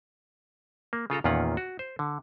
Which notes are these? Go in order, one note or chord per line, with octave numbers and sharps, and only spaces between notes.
A#3
C#3 F4 A4 A#5
E2 A#2 D#3 C#4 F4 F#5
F#4
C5
D3